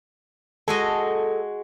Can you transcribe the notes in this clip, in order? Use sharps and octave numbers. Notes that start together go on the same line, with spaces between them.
G#3 F#4 A4 D#5